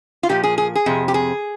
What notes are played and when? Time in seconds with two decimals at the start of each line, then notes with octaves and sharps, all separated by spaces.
0.23 F4
0.29 A#2 F3 G4
0.44 G#4
0.58 G#4
0.75 G#4
0.86 F2 C3
1.08 G4
1.14 G#4